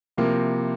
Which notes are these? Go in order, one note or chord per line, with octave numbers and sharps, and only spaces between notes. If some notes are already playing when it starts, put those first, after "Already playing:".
C3 F3 A#3 E4 A#4